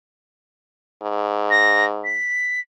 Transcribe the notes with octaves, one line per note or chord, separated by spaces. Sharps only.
G#2
A#6
B6